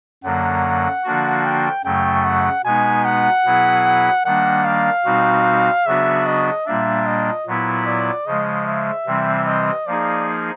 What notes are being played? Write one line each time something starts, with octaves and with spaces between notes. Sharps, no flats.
F#2 D3 F#3 A#3 F#5
D3 F3 A#3 D4 F#4
G5
F#2 C#3 F#3 A3 G5
F#5
B2 G#3 B3 D#4 G#5
F#5
B2 F#3 B3 E4 G#4
D#3 G3 A#3 D4 F#5
F5
B2 G3 C4 D#4 F#4
C#3 F#3 B3 D4 F#4 E5
D#5
A#2 G3 A#3 D4 E5
D#5
A#2 F#3 B3 E4
D5
C#3 F3 G#3 D#5
E5
C3 E3 G3 C4
D#5
F3 A#3 D#4 G#4 D5